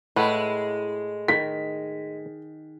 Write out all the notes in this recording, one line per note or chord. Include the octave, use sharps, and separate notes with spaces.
A2 G#3 E4 B4 F#5
D#3 B6